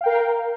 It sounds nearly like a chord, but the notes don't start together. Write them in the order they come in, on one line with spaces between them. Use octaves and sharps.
F5 G5 A#4